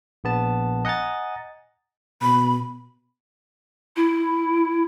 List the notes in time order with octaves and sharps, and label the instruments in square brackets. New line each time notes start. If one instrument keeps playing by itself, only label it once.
[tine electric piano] A#1 B3 A5
D#5 F#5 G#5 A#5 A6
[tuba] B2 [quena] B5
[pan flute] E4